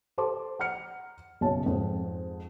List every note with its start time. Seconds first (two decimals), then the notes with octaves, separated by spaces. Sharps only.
0.18 G4 A4 C5 A5 C6 D6
0.59 F#5 A#5 F6 C#7
1.41 B1 F#2 C#3 A5
1.66 F2 G#2